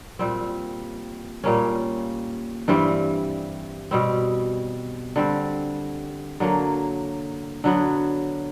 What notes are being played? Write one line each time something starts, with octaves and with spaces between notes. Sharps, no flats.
A#2 G3 C4
A#2 G3 A#3 C#4
G2 E3 G3 C4
B2 G3 C4
D3 G3 C4
D3 F#3 A#3
D3 F#3 B3